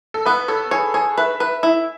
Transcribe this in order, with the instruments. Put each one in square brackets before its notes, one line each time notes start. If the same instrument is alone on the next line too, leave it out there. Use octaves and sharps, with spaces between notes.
[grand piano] A4
[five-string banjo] B3 [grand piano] B4
[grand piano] A4 [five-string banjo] C#5
[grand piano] G#4 [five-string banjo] C#5
[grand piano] G#4 [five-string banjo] C#5
[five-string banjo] B4 [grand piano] E5
[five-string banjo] B4
E4